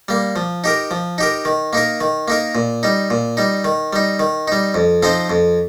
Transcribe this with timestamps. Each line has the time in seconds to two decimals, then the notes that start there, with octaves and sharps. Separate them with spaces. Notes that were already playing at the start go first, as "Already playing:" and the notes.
0.08 G3 A#3
0.36 F3
0.64 D#4 G4 A#4
0.91 F3
1.18 D#4 G4 A#4
1.45 D#3
1.73 A#3 D#4 A#4
2.01 D#3
2.28 A#3 D#4 A#4
2.55 A#2
2.83 G3 D#4
3.10 A#2
3.37 G3 D#4
3.64 D#3
3.93 G3 D#4
4.19 D#3
4.48 G3 D#4
4.74 F2
5.03 F3 C4 D#4 C5
5.30 F2